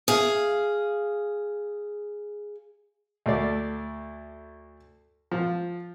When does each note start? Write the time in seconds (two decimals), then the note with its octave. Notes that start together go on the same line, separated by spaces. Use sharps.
0.08 G#4 F5
3.26 D2 A3 D5
5.31 F3